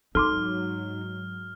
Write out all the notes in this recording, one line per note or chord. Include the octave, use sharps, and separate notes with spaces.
G#2 F#3 D#4 A4 C6 D6 F6